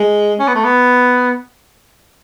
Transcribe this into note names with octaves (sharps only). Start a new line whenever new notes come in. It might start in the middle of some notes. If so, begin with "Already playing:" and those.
Already playing: G#3
C#4
B3
A3
B3